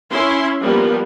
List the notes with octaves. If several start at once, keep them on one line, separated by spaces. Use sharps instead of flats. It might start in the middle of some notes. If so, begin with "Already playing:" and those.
C#4 E4 C6
F3 G3 A#3 B3